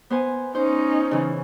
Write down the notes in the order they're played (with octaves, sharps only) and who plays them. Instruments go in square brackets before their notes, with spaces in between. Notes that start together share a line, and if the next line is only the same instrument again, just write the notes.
[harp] B3 C5 G#5
[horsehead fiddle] C#4 D#4 [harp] C5
[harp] C#3 E3